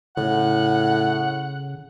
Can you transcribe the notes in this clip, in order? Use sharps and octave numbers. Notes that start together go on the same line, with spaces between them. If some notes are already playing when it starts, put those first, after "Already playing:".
A2 C#3 F#5